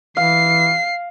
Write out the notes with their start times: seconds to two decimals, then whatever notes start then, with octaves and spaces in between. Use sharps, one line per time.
0.17 E3 F5 C7